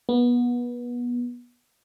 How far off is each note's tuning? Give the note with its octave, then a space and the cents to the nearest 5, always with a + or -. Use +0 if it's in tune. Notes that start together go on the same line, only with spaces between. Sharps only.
B3 -25